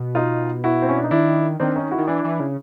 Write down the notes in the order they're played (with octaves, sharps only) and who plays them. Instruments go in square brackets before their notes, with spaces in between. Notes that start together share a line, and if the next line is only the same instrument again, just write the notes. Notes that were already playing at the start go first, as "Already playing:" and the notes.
Already playing: [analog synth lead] B2
[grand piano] D#4 F4
E4 F#4
C4
C#4
D4
D#4
[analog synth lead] D#3 [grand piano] D4 E4
[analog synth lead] D#3 [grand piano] C4 D4
[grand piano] C#4 D#4
E4 F#4
[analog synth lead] D#3
[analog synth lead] E3 [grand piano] D4 E4
[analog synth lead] E3
C#3